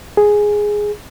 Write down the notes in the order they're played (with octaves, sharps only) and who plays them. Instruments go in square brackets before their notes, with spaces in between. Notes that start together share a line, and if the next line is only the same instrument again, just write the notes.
[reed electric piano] G#4